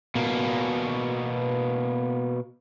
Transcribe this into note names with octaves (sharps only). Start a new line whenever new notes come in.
B2 A#3